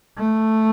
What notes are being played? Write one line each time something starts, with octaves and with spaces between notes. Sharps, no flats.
A3